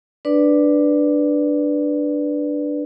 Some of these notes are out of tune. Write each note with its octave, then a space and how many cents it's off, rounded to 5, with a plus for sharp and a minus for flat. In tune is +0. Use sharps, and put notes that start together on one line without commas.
D4 +5 B4 +0 D5 +0